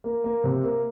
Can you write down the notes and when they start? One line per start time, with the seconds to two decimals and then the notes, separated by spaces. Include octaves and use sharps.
0.04 A#3
0.24 A#3
0.44 C3
0.64 A#3